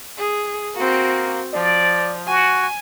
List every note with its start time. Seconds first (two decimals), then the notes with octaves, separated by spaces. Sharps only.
0.17 G#4
0.75 A#3 C4 F#4
1.54 F3 D5
2.27 F#4 G#5